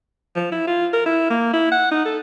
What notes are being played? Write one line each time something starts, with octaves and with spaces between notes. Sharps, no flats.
F3
E4
F4
A#4
E4
A#3
E4
F#5
D#4
A4